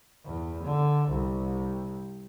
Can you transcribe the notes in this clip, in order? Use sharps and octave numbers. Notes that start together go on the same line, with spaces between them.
E2
D3
C2